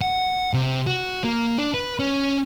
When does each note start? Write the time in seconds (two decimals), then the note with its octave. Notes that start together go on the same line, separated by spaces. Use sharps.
0.01 F#5
0.53 C3
0.87 F#4
1.24 A#3
1.58 D4
1.74 B4
1.99 C#4